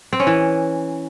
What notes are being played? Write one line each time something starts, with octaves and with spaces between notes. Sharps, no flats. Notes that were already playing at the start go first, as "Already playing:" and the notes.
C4
C#4
E3